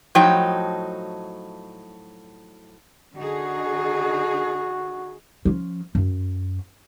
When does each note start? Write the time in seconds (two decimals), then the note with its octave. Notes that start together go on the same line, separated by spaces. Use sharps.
0.15 A2 F3 F#3 D#4 G5
3.17 D3 D#4 F#4 G#4
5.45 F3 C#4
5.95 F#2